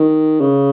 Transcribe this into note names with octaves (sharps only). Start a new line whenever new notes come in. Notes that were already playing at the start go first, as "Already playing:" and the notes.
Already playing: D#3
C#3